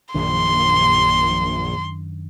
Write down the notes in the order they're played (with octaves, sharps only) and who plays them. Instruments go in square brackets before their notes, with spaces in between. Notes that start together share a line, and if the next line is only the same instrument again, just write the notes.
[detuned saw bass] A#1 [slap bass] F#2 D#3 D4 [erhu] C6